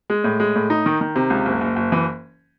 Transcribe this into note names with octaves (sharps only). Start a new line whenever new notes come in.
G#3
A2
G#3
A2
D#4
D#3
D#3
C3
C#2
F#1
F#1
F#1
E3